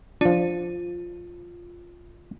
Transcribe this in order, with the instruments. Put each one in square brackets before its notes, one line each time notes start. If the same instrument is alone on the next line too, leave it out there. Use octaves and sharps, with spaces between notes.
[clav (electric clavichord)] F3 D4 [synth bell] F4